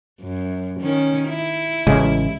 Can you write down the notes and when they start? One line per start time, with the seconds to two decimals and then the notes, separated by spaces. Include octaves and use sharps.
0.22 F#2
0.80 D#3 C#4
1.28 E4
1.87 A1 C#3 G#3